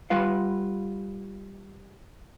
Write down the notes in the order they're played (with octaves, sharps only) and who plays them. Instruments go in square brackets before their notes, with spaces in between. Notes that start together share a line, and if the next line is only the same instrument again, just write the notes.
[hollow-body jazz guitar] G3 F4 B4 F5